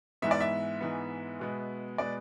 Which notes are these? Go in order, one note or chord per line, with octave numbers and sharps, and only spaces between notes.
G#2 E3 G#3 B3 E5
D5
E5
G#2 E3 G#3 B3
B2 G#3 B3
B2 G#3 B3 D5